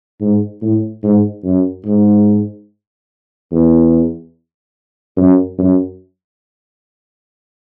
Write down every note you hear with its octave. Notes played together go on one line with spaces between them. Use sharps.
G#2
A2
G#2
F#2
G#2
E2
F#2
F#2